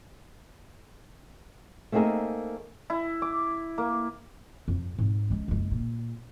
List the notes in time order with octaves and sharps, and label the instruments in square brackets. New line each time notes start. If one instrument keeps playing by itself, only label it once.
[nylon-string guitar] A3 A#3 C4 D#4 G#4 A#4
[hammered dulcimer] E4
D6
A#3
[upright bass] F2
G#2 C4
G#3 C#4
F#1 G#3
A#2